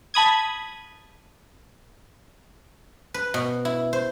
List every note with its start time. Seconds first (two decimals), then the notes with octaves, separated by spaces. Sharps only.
0.14 A5 B5 D#6 G#6
3.14 B4
3.34 B2
3.65 E4
3.93 C5